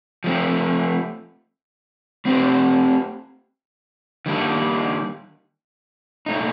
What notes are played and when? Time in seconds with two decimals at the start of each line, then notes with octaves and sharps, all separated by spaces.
0.24 F3 A3 C4
2.25 A3 C4 G4 C5
4.26 D#3 G3 A#3 D4
6.26 A#2 A3 D#4